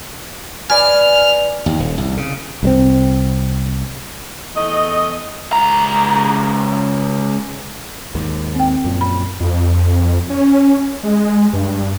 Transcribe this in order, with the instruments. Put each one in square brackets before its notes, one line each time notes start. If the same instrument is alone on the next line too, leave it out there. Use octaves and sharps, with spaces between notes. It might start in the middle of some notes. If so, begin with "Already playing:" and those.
[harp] B4 D5 G#5 [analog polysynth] F6
[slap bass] D#2
D#1
C2
C#3
[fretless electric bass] C2 G3 C4
[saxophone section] E2 A3 D#5
[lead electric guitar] C#2 A#5
[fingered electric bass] D#2 G#2
[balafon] C4 G5
[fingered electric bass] F#2 A#2 F3
[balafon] B5
[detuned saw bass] F2
C#4
G#3
G2